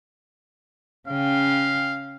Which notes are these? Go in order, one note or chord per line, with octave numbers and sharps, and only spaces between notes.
C#3 F5 G5